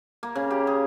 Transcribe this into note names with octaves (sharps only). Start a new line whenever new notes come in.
A#3
C#3
G4
G#4